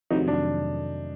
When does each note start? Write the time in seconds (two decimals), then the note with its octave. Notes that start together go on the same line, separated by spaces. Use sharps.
0.10 F2 C3 D#3 F#3 A3 D#4
0.28 D4